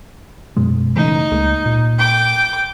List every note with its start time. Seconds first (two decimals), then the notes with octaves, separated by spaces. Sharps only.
0.57 F#2 B2 G#3
0.96 C#3 E3 A3 D#4
1.31 C#2 G#3 A#3
1.66 A#2
1.99 G5 D6